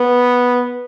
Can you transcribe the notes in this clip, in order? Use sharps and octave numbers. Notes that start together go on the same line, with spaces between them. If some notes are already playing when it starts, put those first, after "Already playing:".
Already playing: B3